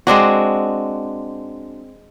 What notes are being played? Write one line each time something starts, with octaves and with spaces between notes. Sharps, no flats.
G#3 C4 D4 F#4